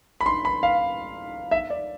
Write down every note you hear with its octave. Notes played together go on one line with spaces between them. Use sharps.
B5
C6
B5
F5
E5
D5